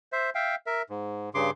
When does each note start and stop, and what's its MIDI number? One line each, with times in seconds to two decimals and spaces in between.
0.13 0.30 72
0.13 0.30 76
0.35 0.55 76
0.35 0.55 77
0.35 0.55 79
0.66 0.82 70
0.66 0.82 76
0.90 1.29 44
1.34 1.51 43
1.34 1.51 49
1.34 1.51 84
1.34 1.51 86